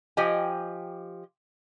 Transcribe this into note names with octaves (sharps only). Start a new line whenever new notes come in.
F3 G4 D#5 G5 G#5